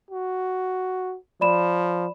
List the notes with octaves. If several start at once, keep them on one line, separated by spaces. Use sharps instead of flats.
F#4
F3 D5 B5 E7